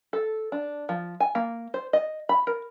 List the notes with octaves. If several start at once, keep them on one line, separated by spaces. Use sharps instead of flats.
A4
D4
F3
G#5
A#3
C5
D#5
B5
A#4